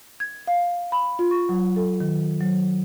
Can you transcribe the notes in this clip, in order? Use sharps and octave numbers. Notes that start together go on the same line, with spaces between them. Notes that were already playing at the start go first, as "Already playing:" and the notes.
G#6
F5
B5
F4
C#6
F#3
A4
D#3
F#3